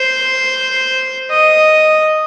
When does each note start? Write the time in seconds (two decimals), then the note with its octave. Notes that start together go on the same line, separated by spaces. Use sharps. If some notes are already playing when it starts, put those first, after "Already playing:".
Already playing: C5
1.31 D#5